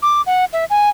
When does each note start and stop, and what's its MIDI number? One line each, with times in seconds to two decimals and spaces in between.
0.02 0.22 86
0.26 0.45 78
0.53 0.65 76
0.70 0.89 80